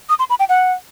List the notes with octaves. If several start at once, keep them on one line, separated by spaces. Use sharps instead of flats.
D#6
C6
B5
G5
F#5